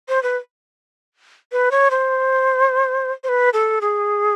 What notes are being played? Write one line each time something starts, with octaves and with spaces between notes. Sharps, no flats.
C5
B4
B4
C#5
C5
C5
B4
A4
G#4